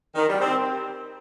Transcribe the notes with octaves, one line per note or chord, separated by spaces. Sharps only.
D#3 D#4
G3
G4 A#4
C4